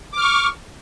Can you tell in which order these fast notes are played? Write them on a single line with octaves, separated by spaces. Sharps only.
D6 F6 C#6